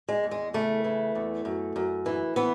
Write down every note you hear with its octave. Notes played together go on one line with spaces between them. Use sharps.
G#3
E2
G#3
C#3 A3
E3
E2
F#2
F#2
E3
E3 B3